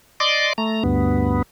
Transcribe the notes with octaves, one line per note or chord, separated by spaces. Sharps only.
D5 D#5 C6 D6
A3 A#5
D2 G2 B3